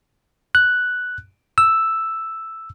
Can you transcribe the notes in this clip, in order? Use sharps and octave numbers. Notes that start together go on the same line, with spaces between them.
F#6
E6